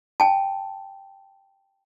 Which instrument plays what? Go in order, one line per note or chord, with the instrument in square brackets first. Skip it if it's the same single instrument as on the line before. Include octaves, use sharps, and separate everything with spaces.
[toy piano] G5 A5